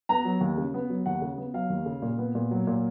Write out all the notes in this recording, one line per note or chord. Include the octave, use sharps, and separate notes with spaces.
B3 A#5
F#3
D#2
C#3
B3
F#3
D#2 F#5
C#3
B3
F#3 F5
D#2
C#3
A#2
B3
A#2
F#3
A#2